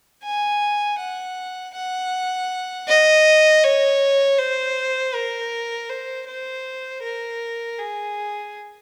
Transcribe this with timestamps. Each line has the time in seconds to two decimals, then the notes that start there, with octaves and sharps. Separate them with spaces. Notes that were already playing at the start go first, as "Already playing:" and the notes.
0.24 G#5
0.99 F#5
1.75 F#5
2.88 D#5
3.64 C#5
4.39 C5
5.14 A#4
5.90 C5
6.28 C5
7.03 A#4
7.79 G#4